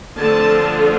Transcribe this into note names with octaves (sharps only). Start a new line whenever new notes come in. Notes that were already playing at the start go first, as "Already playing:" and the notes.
D3 F3 A3 C4 F4 A5